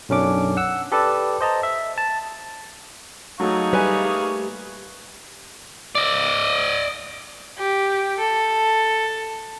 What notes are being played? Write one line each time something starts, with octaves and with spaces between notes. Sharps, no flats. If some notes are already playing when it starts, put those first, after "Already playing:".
B1 F#2 C#4 D4 D6
F#5 E6
G4 A4 B4 D5 E6
C5 D#5 A5 A#5
E5
A5
F#3 A3 D#4 G#4 F5 C#6
G3 A3 A#3 B4 G#5
D5 D#5
G4
A4